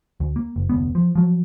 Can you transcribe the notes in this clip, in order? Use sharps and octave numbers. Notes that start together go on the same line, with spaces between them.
D2
A#3
F#1
F1 D2 B3
F3
F3 F#3